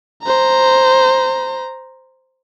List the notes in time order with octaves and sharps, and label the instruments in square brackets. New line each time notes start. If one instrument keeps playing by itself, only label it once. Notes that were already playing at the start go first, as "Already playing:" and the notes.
[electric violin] C5 A#5